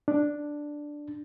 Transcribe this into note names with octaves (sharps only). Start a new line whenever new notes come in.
D4